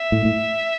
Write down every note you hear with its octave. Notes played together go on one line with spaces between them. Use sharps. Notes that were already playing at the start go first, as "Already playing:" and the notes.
Already playing: E5
A2
A2